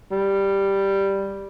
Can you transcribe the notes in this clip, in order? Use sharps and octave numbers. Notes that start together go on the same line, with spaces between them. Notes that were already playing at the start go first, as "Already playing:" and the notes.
G3